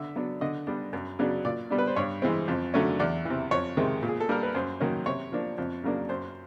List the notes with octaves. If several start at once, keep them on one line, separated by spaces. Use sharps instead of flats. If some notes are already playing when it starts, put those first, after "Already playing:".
Already playing: D3 E5
F#3 B3 D4
D3 D#5
G3 B3 D4
F#2
C#3 F#3 B3 D4
A#2 D5
G3 B3 D4
B4
C5
G2 C#5
E3 G#3 C4
F2
D3 F#3 A3 C#4
E2 D5
C3 E3
F2 C#5
C3 D#3 G#3
A#2
G#4
A4
G3 A#3 D4 A#4
B4
F#2 C5
D#3 F#3 A#3 C#4
C3 C#5
F3 A#3 D4
F2
C#3 F#3 A#3 D4
F#2 C5